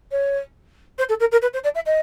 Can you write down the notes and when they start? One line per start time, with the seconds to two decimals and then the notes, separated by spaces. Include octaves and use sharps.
0.11 C#5
0.98 C5
1.09 A4
1.20 A#4
1.32 A#4
1.42 B4
1.54 C5
1.64 D5
1.75 E5
1.86 D#5